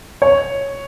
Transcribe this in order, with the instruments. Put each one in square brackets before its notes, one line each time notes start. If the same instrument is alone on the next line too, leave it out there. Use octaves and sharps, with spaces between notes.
[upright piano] C#5